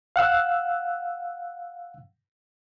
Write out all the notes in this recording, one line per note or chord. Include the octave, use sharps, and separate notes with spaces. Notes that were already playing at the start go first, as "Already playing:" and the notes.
F5 F#5 E6 F#6